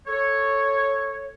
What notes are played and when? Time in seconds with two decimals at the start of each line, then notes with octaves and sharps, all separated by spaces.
0.07 A4 C#5